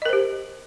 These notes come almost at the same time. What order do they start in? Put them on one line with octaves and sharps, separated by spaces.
D#5 A#4 C5 G4